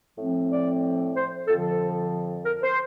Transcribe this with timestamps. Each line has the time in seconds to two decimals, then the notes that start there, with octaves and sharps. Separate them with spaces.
0.17 A2 F3 C4
0.50 D5
1.15 C5
1.47 F2 D3 F3 A4
1.64 A4
2.45 A#4
2.63 C5